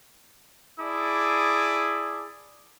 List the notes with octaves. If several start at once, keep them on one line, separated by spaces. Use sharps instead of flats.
E4 G#4 D5 A5 D6 D#6